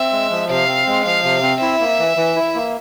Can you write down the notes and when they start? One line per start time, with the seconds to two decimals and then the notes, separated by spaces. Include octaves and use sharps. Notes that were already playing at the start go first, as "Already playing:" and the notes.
Already playing: C4 E5
0.12 G#3
0.31 F3
0.50 C3 F5
0.68 C4
0.87 G#3
1.06 F3 F5
1.24 C3
1.43 C4
1.61 E4 E5
1.80 A#3
1.99 E3
2.17 E3
2.36 E4
2.55 A#3